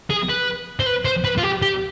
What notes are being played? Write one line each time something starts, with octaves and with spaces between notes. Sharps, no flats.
G#4
B4
C5
B4
C5
B4
F4
G4
G4